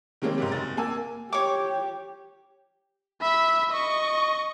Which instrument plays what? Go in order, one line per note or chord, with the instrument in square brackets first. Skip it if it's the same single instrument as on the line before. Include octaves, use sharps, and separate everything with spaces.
[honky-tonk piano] D#3 G3 G#3 A#3 C4 C#4
G#2 C3 G3
F#1 A6
A#3 G#5 E6
[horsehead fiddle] G4 [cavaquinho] C#5 D6
[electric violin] E5 B5
D#5 C#6